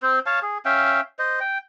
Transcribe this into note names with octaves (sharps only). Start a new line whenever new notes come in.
C4 C5
C#5 F5 A5
G#4
C#4 E5 F5 G5
C5 D#5
G5